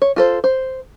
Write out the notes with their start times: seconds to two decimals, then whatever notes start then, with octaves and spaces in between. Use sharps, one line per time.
0.02 C#5
0.16 F4 A4 C5
0.44 C5